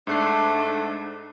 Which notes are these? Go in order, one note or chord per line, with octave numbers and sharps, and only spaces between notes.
G#2 A3 D4 F#6 C7